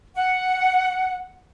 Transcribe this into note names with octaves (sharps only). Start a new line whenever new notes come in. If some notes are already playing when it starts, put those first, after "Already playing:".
F#5